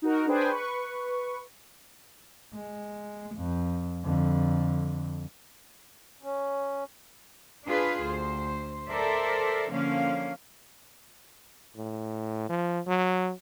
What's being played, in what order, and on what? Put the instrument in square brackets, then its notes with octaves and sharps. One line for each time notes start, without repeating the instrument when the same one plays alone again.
[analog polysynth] D#4 F#4 A#4
D4 G#4 B4 C5 G5 G#5
B4 C#6
[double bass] G#3
F2
F2 D3
[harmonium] C#4
[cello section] D4 F4 G#4 B4
D2 C5
A4 A#4 C5 D5 E5
D3 F3 A#3 C#4 F5
[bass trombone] A2
F3
F#3